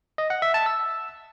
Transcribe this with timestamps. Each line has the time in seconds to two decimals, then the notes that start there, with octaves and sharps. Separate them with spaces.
0.18 D#5
0.30 F#5
0.42 E5
0.54 A5
0.66 E6